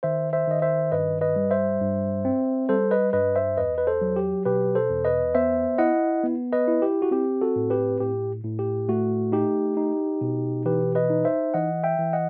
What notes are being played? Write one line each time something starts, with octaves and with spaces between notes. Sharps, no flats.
D#3 C5 E5
C5 E5
D#3 D#5
C5 E5
G2 B4 D#5
B4 D#5
G3
C5 E5
G2
C4
G3 A4 C5
B4 D#5
G2 B4 D#5
C5 E5
E2 B4 D#5
B4
A4 C5
F#3
G4
B2 G4 B4
A4 C5
E2
B4 D#5
B3 C5 E5
E4 D#5 F#5
B3
B4 D#5
E4
G4
F#4
C4 G4
F#4 A4
A2
G4 B4
A2 G4
A2
G4
A3 F#4
D#4 G4
D#4
B2
E3 G4 B4
B4 D#5
D#4
C5 E5
E3 D#5 F#5
E5 G5
E3
D#5 F#5